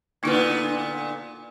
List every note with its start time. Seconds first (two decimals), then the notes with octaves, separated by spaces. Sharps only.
0.23 A#2 D3 A#3 B3 D#4 E4